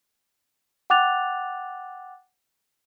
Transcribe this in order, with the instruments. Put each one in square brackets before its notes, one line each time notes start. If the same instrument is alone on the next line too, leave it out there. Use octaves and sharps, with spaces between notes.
[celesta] F#5 G5 D6 F#6 A6 F7